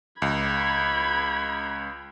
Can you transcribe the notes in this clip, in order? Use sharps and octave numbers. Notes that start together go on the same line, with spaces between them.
C#2 B5 G#6